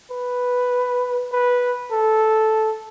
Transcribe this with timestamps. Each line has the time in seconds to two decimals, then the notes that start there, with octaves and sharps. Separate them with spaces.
0.11 B4
1.32 B4
1.92 A4